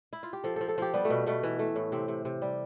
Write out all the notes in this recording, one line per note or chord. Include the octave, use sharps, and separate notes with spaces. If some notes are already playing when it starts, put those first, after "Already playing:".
E4
F4
G4
F3 A4
F3 A4
A4
F3 G4
G3 B3
A3
B2
B2 A3
E3
A3
A2
C3 C4
C3
C3
G3